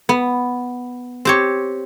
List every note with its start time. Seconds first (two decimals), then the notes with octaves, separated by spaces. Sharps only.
0.09 B3
1.25 C4 G4 C#5